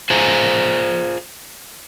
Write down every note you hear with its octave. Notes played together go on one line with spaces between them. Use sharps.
F4 G#4 C5 G#5 A#5